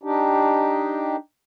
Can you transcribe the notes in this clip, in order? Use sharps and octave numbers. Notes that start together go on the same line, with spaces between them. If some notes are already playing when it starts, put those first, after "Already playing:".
D4 D#4 G4